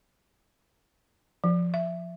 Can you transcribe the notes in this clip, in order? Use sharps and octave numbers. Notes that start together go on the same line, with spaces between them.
F3
E5